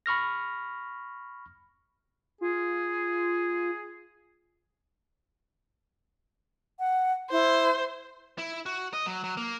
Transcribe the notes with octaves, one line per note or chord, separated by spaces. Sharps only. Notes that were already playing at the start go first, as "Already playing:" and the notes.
B5 C#6 F6 A#6
F4 G#4
F#5
E4 C5
E4
F#4
D#5
F#3
F#3
A#3